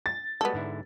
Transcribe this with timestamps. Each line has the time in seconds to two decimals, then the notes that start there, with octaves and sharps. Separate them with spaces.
0.06 A6
0.41 G3 G#3 B3 F#4 A4
0.54 G#2 D3 E4